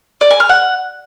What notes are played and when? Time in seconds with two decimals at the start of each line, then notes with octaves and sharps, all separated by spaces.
0.21 D5
0.30 G#5
0.40 F6
0.49 F#5